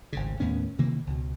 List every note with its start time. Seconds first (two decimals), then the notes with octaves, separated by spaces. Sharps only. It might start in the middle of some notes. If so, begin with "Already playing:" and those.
0.13 G#1 D2 C#3
0.40 D#2 A2 B3 C#4
0.78 C3 D#3 E3 A#3
1.07 C#2 B2